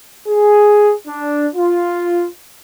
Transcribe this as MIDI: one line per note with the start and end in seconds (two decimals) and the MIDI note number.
0.28 0.92 68
1.07 1.47 62
1.55 2.26 65